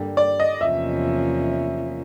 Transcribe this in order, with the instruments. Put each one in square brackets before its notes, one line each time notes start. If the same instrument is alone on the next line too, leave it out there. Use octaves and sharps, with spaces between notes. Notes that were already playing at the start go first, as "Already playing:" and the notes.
Already playing: [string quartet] G2 D3 G3 A#3
[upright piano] D5
D#5
[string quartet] E2 C3 F3 A#3 C#4 [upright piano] E5